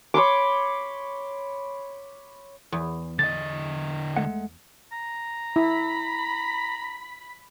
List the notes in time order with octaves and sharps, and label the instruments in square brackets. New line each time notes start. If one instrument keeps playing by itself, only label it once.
[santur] C#5 B5 C6 D6
[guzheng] E2
[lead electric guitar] D3 D#5 [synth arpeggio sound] A6
[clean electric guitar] G#3 A3 F#5
[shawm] A#5
[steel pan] E4 [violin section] B5 B6